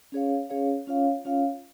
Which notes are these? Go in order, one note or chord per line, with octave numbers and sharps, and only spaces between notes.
C#4 G#4 C#5 F5
C#4 G#4 C#5 F5
C#4 F4 C#5 F5
C#4 F4 C#5 F5